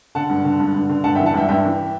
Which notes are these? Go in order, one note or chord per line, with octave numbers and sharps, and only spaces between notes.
D3 F#5 A5
G2
D3
G2
G2
D3
G2 F#5 A5
E5 G5
E3
F#5 A5
G2 E5 G5
G2 E5 G5
E3